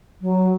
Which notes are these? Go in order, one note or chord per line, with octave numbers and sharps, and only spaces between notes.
F#3